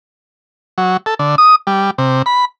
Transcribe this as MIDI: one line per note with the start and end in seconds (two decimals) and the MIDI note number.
0.78 0.97 54
1.06 1.14 69
1.19 1.35 50
1.38 1.55 87
1.67 1.91 55
1.98 2.22 48
2.26 2.45 83